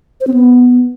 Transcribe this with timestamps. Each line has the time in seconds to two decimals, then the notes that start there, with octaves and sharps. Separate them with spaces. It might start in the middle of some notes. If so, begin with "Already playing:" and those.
0.21 C5
0.27 C4
0.34 B3